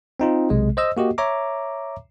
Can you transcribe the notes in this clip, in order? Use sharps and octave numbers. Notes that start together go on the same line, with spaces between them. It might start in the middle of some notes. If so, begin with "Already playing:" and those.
C4 D#4 F4
B1 C3 G#3
C5 D#5 E6
A#3 F#4 G4 D#5
C#5 E5 A#5 D6